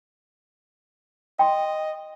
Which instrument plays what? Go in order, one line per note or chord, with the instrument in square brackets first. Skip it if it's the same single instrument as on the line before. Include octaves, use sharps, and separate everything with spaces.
[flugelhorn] D#5 [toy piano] G5 C6